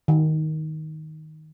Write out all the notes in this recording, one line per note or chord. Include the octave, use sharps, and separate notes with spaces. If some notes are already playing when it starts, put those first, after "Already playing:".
D#3